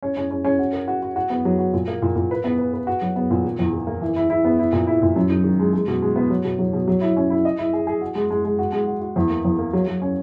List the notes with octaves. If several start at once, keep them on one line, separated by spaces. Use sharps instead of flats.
C#4
C#4
C#4
C#4
F#4
A#4
F#4
F#4
F#4
B3
F#3
F#4
A#2
A#3
A#2
A#2
B4
B3
B4
B4
F#4
F#3
B3
A#2
D#3
E2
D#3
A#3
E3
E4
E4
B3
E4
A#2
E4
A#2
F#2
D#4
D#3
G#3
G#3
B2
G#3
B3
F#3
B2
F#3
B2
F#3
E4
C#4
E4
D#5
E4
G#4
G#4
F#4
G#3
G#3
G#3
F#4
G#3
F#4
F#4
E2
A#3
E2
A#3
F#3
F#3
C#4